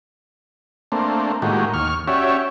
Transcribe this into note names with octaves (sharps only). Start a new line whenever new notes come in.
A3 A#3 C4 D4
A2 D#3 G#3 A#3 F#4 G4
D#2 C#6 F6
C#4 F#4 G4 C#5 D5 E5